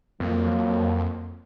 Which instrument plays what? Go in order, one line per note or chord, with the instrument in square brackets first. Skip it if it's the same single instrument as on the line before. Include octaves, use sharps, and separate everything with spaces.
[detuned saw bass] F2 [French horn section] F#3 A#3